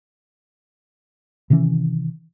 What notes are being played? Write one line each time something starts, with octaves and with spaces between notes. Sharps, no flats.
C3 D#3 E3 C#4